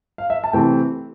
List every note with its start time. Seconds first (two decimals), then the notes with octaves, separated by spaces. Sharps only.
0.18 F5
0.30 E5
0.44 A5
0.53 C3 E3 A3 C4 G5